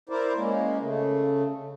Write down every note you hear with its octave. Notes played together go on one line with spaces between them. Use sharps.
E4 A#4 C5 D5
G#3 A#3 C#4
C#3 A3